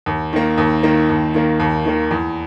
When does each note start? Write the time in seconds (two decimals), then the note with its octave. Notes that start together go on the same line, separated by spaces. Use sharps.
0.06 D#2
0.33 D#3 A#3
0.58 D#2
0.83 D#3 A#3
1.10 D#2
1.34 D#3 A#3
1.60 D#2
1.85 D#3 A#3
2.11 E2